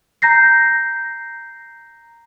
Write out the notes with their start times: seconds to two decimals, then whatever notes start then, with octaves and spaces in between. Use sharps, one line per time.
0.22 A#5 G6 A#6 C7